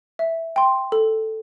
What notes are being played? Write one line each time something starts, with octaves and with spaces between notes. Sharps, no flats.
E5
G5 C6
A4